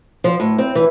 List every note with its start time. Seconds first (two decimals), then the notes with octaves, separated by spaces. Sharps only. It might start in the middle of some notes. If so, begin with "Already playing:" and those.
0.24 F3
0.40 A2
0.59 C4
0.75 E3